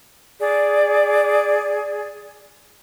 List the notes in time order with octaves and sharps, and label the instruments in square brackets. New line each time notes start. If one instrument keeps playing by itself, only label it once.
[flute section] G#4 D5